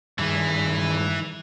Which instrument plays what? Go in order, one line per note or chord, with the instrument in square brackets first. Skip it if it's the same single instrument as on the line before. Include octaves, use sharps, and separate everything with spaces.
[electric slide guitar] G2 D#3 G#4 [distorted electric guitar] E3